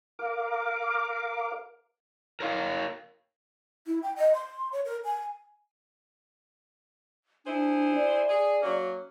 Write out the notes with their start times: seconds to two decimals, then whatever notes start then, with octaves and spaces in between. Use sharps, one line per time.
0.19 A#4 F5 D6
2.40 A#4 C#5 F5
3.87 E4
4.03 G5
4.16 D#5
4.34 C6
4.72 C#5
4.85 A#4
5.04 G#5
7.46 D4 E4 G#4 C5
7.94 D5
8.29 G#4
8.61 F#3 A#3 C#4